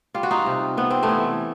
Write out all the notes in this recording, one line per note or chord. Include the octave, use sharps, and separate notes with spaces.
G3 F4
F#4
D#4 F4
C3
C3 B3
C4
A3 B3
E3